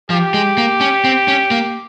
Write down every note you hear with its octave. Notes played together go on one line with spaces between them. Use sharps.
F3 G4
G#3
A#3
C#4
C4
C#4
A#3